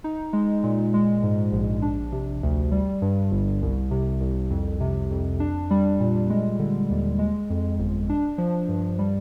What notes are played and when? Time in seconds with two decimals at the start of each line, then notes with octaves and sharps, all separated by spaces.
0.04 D#4
0.33 G#3
0.63 A#2
0.94 G#3
1.23 G#2
1.52 A#1
1.82 D4
2.12 C3
2.43 D2
2.72 G3
3.02 G2
3.31 G1
3.62 C2
3.91 C3
4.21 C2
4.50 F2
4.80 C3
5.11 F2
5.40 D4
5.71 G3
6.00 A#2
6.30 G#3
6.59 D3
6.90 D#2
7.19 G#3
7.50 F2
7.79 G1
8.09 D4
8.38 F3
8.69 G2
8.99 G3